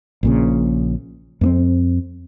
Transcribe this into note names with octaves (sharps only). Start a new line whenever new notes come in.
A#1 A#2 C#3
F2 A#3 C4